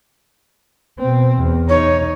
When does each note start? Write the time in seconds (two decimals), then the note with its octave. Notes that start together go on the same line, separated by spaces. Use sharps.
0.99 B2 C4
1.36 E2
1.69 D#4 C#5